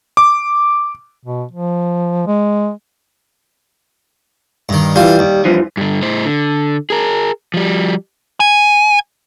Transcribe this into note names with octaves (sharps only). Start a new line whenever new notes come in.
D6
B2
F3
G#3
G2 D#3
E3 G3 F4
D#2
G2 E3 F3
G2 D3
A2 C5
D3
G#4 A#4
F3 G3
G#5